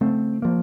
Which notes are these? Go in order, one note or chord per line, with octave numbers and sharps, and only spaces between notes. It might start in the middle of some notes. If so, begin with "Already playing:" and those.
C#3 A3 C4
F3 A#3